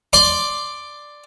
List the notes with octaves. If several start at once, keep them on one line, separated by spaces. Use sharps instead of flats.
D5 C6 D6